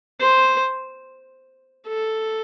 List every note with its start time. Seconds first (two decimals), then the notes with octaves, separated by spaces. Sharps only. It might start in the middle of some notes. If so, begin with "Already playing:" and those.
0.21 C5
1.87 A4